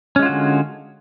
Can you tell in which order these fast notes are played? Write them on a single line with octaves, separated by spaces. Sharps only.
C#4 G#3 F4 F#4 D3